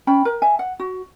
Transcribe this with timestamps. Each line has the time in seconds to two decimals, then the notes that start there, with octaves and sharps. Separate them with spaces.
0.07 C#4 G5 B5
0.25 A#4
0.42 E5 G#5
0.59 F#5
0.79 F#4